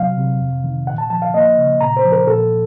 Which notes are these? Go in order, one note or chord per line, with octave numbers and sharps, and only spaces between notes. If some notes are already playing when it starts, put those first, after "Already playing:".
Already playing: C3 F#3 F5
C3
F2
D#3
A#2 F#5
A5
F3 A5
F5
A#3 D#5
C#3
A#2 A#5
C5
F3
A#4
A#2 A4